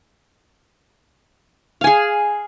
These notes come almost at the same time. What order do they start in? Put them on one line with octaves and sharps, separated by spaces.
F5 G#5 G#4